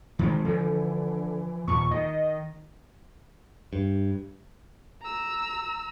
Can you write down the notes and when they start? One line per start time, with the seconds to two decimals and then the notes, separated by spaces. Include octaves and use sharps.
0.19 D#3 G#3 C4
0.45 D3 E3 F3
1.67 D#2 A#2 C#6
1.91 D#3 D#5
3.73 G2
5.02 A#5 E6